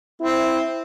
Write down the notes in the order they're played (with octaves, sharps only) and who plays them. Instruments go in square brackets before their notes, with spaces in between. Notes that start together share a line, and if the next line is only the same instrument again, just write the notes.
[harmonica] C4 [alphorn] E4